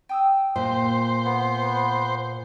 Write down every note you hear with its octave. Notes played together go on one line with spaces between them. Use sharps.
G5 D#6 E6
A#2 C5
B3